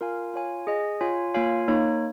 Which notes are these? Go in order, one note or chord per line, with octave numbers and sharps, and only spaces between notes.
F4 A#4 F5 G#5
F4 C#5 F5 G#5
G#4 D#5 G#5
F4 C#5 F5 G#5
A#3 F4 C#5 F5 G#5
A#3 D#4 C#5